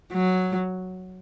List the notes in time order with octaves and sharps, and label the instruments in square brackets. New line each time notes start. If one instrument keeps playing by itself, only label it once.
[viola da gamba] F#3